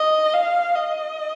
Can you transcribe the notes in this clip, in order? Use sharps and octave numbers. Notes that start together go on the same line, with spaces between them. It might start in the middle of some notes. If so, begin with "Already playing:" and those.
Already playing: D#5
F5
D#5